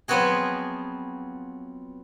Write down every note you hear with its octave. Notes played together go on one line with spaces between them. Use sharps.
F3 F#3 B3 C4 F#4 G#4